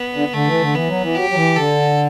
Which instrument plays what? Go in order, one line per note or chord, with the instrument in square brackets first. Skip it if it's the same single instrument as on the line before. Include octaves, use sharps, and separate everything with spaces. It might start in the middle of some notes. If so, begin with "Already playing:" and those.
Already playing: [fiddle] B3
[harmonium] D3
[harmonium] D3 [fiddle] A3
[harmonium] E3
D3
[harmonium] E3 [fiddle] B3
[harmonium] F#3
E3
[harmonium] F#3 [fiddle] G4
[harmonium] F#3
E3
[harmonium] D3 [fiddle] A4